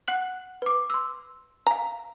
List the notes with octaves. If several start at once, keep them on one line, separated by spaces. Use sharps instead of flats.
F#5 F#6 F#7
B4 D6
C6 E6
F5 G#5 A#5